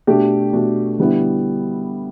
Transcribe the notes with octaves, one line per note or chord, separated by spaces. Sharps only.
B2 A3 D4 G4
B2 A3 D4 G4
D3 G3 B3 E4